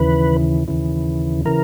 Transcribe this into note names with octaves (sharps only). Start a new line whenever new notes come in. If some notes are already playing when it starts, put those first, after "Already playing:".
Already playing: D#2 C#3 E3 B4
D#2 C#3 E3
C#3 E3 A#4